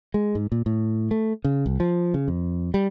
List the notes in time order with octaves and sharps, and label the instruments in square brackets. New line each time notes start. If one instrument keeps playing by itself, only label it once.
[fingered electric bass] G#3
G#2
A#2
A2
A3
C#3
C2
F3
C#3
F2
G3